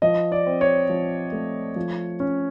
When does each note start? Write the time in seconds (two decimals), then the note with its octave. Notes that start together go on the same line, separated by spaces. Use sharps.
0.02 F3 D#5
0.32 D5
0.46 C4
0.61 C#5
0.90 F3
1.32 A3
1.76 F3
2.20 C#4